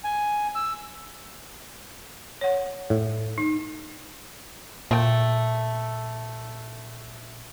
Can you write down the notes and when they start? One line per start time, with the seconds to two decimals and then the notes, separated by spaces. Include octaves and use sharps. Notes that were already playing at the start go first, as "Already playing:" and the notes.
0.04 G#5
0.55 E6
2.41 C#5 F#5
2.90 A2
3.38 D#4
4.91 A#2 A3 G5